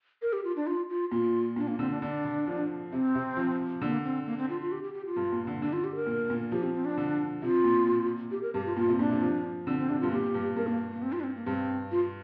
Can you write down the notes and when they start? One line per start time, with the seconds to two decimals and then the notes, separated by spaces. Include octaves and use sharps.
0.22 A#4
0.33 G4
0.44 F4
0.56 D4
0.67 F4
0.89 F4
1.11 A#2 F4
1.56 A#2 D4
1.68 A#3
1.79 D3 C4
1.90 D4
2.02 D3 D4
2.25 D3
2.47 F3
2.91 C3 C4
3.15 C3
3.37 F3
3.81 D3 A#3
4.04 C4
4.26 A#3
4.38 C4
4.50 F4
4.61 F4
4.72 G4
4.83 G4
4.94 G4
5.06 F4
5.16 G2
5.32 A#2
5.47 D3
5.62 D3 D4
5.73 F4
5.84 G4
5.95 A#4
6.07 A#2
6.30 A#2
6.52 F3 G4
6.63 C4
6.74 C4
6.85 D4
6.97 D3
7.42 C3 F4
7.64 A#2
7.87 A#2
8.31 G4
8.43 A#4
8.54 G2 G4
8.66 F4
8.77 A#2 F4
8.88 C3
8.99 A#2 D4
9.11 C3
9.22 F3
9.67 D3 C4
9.79 C4
9.89 C3 D4
10.00 G2 F4
10.11 A#2 G4
10.34 G2
10.56 G2 A#4
10.67 A#3
10.91 A#3
11.02 C4
11.12 F4
11.20 D4
11.24 C4
11.36 A#3
11.47 G2 C4
11.92 F4